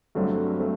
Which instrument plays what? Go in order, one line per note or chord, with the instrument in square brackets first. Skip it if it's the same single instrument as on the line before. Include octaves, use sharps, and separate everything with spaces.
[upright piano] G2 D3 F#3 A3 C4
A3 C4